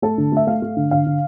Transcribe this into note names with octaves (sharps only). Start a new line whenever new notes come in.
A3 A4
D3
A3 E5
A3 F5
A3
D3
D3 F5
D3